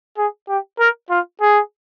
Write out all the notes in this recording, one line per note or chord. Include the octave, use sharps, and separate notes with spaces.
G#4
G4
A#4
F4
G#4